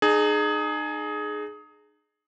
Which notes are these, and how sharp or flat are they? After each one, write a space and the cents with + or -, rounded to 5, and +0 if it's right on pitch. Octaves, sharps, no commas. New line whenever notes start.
D#4 -35 G#4 +15